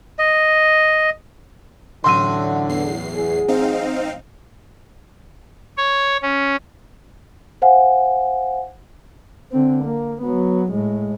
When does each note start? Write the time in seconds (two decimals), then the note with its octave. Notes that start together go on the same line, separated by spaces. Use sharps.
0.19 D#5
2.04 A1 D3 F#3 C6 E6 D#7
2.69 E2 C7
3.15 G#4
3.48 C4 D#4 F5
5.77 C#5
6.22 C#4
7.62 C5 F5 F#5 G#5
9.51 D3 C4
9.85 A#3
10.22 F#3 B3
10.71 A2 G#3